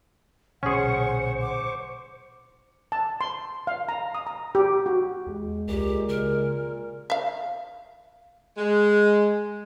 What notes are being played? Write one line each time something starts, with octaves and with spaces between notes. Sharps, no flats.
B1 A#2 D3 C#4 G#4 C5 F#5 C#6
D6
A5
C6
F5
A#5
D#6
A#5
G4
F#4
E2 G#3
C#2 A#2 G4
C#3 A#4
E5 F5
G#3